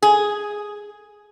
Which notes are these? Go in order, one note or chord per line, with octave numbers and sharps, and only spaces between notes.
G#4